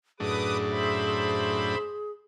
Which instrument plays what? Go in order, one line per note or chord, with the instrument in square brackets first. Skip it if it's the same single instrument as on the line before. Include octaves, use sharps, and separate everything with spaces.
[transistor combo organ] F#2 A2 D4 [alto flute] G#4 [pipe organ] B4 D6 D#6
[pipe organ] C5 E5 B5